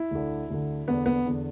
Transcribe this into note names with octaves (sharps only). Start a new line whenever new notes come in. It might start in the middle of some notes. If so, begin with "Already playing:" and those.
Already playing: E4
D2 D3
D2 D3
E2 D3 B3
B3
E2 D3